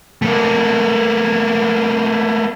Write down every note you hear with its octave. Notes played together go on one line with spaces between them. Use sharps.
A3 A#3